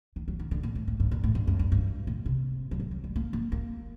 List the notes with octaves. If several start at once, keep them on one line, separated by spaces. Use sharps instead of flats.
D#3
F#3
D#3
D3
A#2
A2
A2
G2
A#2
A2
G2
F#2
G2
G2
A#2
C3
F#3
D#3
F#3
G3
A#3
A#3
A#3